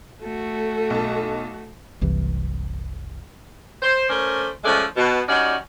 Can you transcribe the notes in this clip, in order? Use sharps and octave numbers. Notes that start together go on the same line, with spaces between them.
A3 F#4 A4
B1 A5
F#1 C2 C3 E3
C5
A3 C#4 A#4 C5 D5
F3 G#3 A3 C#4 D5
B2
G3 C#4 D#4 F#4 D5